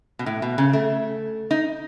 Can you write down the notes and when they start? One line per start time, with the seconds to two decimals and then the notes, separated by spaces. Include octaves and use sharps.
0.19 B2
0.26 A2
0.42 B2
0.58 C#3
0.73 A3
1.51 D#4